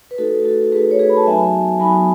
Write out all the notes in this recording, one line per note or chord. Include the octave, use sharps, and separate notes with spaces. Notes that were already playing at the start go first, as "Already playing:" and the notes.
B4
A3 D#4 F#4 A4
F#4 A4
A3 D#4 F#4 G#4 B4
C#5
G#4 B4
B5
A5
F#3 B3 D#4 F#4 E5 G#5
F#3 B3 D#4 F#4 G#5 B5